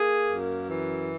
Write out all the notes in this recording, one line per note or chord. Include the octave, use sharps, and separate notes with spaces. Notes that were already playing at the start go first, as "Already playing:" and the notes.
Already playing: A#3 G#4
F#2
E3